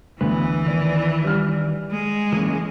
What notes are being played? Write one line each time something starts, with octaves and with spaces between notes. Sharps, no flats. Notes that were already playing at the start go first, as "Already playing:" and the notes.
D2 E3 B3 B4
D#3 D5
G3 F6
G#3
E3 A#3 C#4